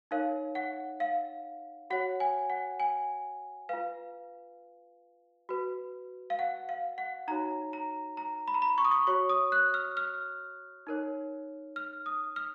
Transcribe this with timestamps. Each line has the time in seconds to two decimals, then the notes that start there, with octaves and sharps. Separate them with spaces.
0.11 D#4 A#4 C#5 F5
0.55 F#5
1.00 F5
1.90 F#4 C#5 F#5
2.20 G#5
2.50 F#5
2.80 G#5
3.69 F4 B4 F5
5.49 F#4 B4
6.30 F5
6.39 F#5
6.69 F5
6.98 F#5
7.28 D#4 F#4 C#5 A#5
7.73 A#5
8.17 A#5
8.48 B5
8.54 A#5
8.62 B5
8.78 C#6
8.85 D#6
8.91 C#6
9.07 F#4 C#5 C#6
9.29 D#6
9.52 F#6
9.74 F6
9.97 F6
10.87 D#4 A#4 C#5
11.76 F6
12.06 D#6
12.36 F6